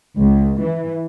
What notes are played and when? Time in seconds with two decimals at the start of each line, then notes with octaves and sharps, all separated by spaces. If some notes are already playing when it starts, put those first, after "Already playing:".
0.18 C#2
0.60 E3